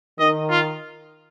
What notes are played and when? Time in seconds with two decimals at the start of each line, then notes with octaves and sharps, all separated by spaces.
0.19 D#3 D#5
0.50 F4